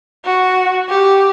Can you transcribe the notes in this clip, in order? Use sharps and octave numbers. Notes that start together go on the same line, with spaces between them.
F#4
G4